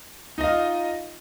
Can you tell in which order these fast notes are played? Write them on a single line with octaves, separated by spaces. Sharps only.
D#4 D#5 F5 F4